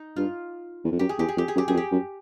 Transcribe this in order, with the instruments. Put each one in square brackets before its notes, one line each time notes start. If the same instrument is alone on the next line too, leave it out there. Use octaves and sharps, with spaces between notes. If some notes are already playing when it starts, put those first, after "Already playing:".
Already playing: [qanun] D#4
[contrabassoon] G2 [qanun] F4
[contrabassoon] E2
F2
[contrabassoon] F#2 [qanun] G4
[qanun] G#4
[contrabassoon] E2 [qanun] G4
[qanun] G#4
[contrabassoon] F2 [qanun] G4
[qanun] G#4
[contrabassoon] F#2
[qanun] G4
[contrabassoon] F#2 [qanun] G#4
[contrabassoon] F2
[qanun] G4
[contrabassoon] F#2